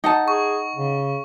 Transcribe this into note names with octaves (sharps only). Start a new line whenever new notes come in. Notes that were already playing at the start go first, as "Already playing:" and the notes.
D#4 F#5 A5
G#4 C#6
C#3